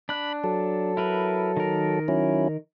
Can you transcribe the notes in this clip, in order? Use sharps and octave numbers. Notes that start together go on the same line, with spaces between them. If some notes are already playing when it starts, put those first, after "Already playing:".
D4 B5 F#6
F#3 A4
E4 A#4 B4
D#3 A#4
F#3 C#4 E4